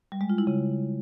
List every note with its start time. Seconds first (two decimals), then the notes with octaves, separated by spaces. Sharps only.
0.12 G3
0.21 G#3
0.30 F4
0.38 E4
0.47 C#3